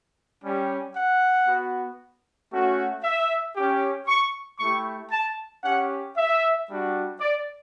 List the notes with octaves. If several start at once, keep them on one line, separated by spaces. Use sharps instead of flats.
G3 C#4 G4
F#5
B3 F#4
A3 C#4 F#4
E5
C#4 G4
C#6
A3 E4 G4 C#6
A5
C#4 G4 F#5
E5
G3 D4 F#4
D5